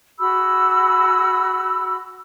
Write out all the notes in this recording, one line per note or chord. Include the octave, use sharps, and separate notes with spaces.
F#4 G#4 B5 E6